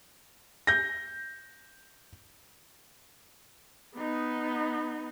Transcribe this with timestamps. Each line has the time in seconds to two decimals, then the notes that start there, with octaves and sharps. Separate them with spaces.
0.67 G6 A#6
3.96 B3 D#4